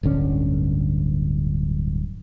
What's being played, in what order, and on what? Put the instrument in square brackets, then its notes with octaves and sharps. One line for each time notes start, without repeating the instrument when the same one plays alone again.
[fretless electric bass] D1 G1 D3 C#4